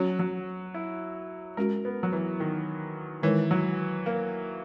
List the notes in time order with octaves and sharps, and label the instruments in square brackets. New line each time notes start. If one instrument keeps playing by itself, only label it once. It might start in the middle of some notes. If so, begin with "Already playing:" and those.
Already playing: [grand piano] F#3 [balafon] C#4 F#4 C#5
[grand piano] F#3
E4
[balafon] G#3 C#4 F#4 [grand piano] A#4
[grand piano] B3
F#3
E3
D#3
[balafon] D#3 G#3 D#4 A#4 C#5 [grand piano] E3
[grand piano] F#3
A#3